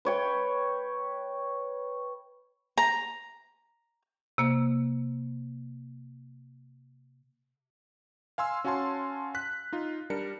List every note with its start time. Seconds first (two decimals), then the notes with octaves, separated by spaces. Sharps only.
0.05 B4 C#5 G5
2.78 A#5
4.38 C3 A#3
8.38 F5 G#5 C6 E6
8.64 C#4 F#4 F5 G#5 A5 C6
9.35 F#6 B6
9.73 D#4 F4
10.10 G3 D4 A#4 C#7